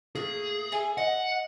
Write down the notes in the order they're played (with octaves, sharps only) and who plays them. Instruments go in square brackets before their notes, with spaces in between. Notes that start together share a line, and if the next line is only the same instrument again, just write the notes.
[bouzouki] A2 A#3 [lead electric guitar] G#4
[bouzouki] A4 E5 G#5
[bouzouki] D#5 [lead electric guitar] F#5